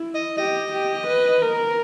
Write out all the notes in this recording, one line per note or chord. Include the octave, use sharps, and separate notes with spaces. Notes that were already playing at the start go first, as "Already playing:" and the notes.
Already playing: E4
D#5
G4 D#5
G4
B4
A#4